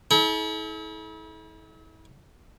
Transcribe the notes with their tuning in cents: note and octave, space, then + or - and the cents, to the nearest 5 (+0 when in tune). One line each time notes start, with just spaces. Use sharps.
E4 -40 A4 -40